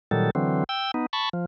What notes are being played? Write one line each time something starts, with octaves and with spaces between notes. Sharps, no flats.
A#2 D#3 F#3 G3 A4
D3 E3 F#3 C4
G5 E6
B3 D#4
A5 B5 C#6
F3